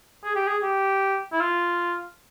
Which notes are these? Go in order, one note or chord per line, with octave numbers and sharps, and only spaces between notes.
G#4
G4
G#4
G4
E4
F4